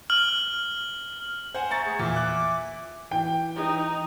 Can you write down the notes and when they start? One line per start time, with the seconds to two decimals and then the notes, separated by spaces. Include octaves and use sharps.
0.10 F6 F#7
1.54 C5 F#5 G#5
1.71 E5 G#5 A#5 C#6 A6 C#7
1.86 A3 G#4
1.99 E2 A#2 E5 G#5 D6
2.16 F#6
3.11 E3 G5
3.56 D#4